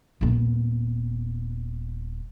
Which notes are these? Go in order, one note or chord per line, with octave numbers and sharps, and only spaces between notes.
D#1 B3